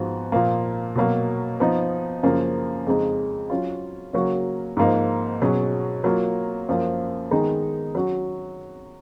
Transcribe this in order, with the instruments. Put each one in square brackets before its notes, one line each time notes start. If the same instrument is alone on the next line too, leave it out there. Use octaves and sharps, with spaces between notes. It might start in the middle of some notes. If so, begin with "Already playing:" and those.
Already playing: [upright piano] G#2 F3 B3 F#4
A#2 F3 A#3
B2 F#3 A#3
F3 B3 D#4
F#2 C#3 F3 A#3
F2 C#3 G#3 D#4 G#4
F#3 C#4 F4
C#3 F#3 A#3 C#4 F#4
G#2 F3 A#3 D#4
B2 F#3 C#4 G#4
F#3 A#3 F4
F#2 F3 A#3
D#3 G#3 B3 D#4 G#4
F#3 C#4 F#4